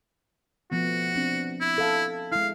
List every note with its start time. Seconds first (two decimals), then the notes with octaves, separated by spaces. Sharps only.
0.72 F3 A3 B3 F#4
1.15 C4 D4
1.61 E4
1.78 A4 F5
2.32 G#3 E4 F5